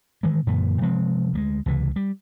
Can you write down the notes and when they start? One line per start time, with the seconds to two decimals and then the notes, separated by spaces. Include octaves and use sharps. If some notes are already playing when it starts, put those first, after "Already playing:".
0.23 D#3 E3 G#3
0.47 F#2 A#2 D3 E3
0.81 C3 F3 G#3 C4
1.33 D2 G3 G#3
1.66 C#2 C3 E3
1.96 G3